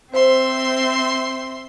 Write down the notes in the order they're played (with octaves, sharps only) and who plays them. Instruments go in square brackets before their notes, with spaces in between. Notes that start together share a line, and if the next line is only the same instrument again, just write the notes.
[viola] C4 [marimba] C5 [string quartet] E5 C6